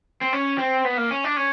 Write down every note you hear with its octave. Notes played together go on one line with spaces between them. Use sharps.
C4
C#4
C4
B3
A#3
C#4
D4
C#4